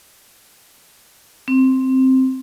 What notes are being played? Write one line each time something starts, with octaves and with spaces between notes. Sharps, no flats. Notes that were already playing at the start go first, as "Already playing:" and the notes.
C4